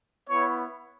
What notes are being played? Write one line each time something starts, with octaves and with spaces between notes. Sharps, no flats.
B3 E4 C#5